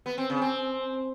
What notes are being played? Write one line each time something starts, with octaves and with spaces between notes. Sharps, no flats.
B3
C4
C#3
C4